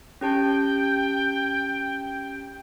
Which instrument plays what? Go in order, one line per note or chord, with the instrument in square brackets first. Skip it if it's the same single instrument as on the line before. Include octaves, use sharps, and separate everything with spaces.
[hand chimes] C#4 G4 A5 [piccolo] G5